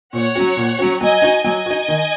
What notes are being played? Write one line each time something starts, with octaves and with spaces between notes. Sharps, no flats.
A#2 C#5 F#5
F#3 C#4 F#4
A#2
F#3 C#4 F#4
F#3 D#5 G#5
D#4 F#4
F#3 D#5 G#5
D#4 F#4
D#3